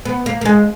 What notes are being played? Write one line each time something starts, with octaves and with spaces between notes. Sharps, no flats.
B3
A#3
A#3
G#3